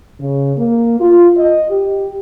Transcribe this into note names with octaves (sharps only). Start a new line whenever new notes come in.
C#3
A#3
F4
D#5
G4